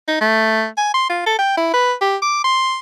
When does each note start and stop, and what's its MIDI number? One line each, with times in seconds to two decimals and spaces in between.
0.08 0.19 63
0.21 0.67 57
0.77 0.93 80
0.94 1.05 84
1.10 1.23 65
1.26 1.36 69
1.39 1.54 79
1.57 1.72 64
1.74 1.93 71
2.01 2.17 67
2.22 2.43 86
2.44 2.80 84